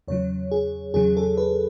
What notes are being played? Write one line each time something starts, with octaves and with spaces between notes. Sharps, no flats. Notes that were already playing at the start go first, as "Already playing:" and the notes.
E2 C#3 F#3 C#5
G#4
E2 C#3 F#3 G#4
A4
B4